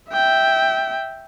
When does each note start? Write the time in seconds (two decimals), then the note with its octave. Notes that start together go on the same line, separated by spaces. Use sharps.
0.12 E5 G5